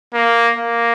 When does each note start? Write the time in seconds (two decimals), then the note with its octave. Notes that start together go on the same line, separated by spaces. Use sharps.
0.14 A#3
0.57 A#3